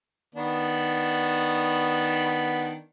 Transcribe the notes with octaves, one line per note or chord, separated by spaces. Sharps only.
D#3 B3 D4